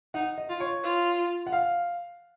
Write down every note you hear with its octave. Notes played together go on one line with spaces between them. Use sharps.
D#4 F#5
D#5
F4
C#5
F4
F#5
F5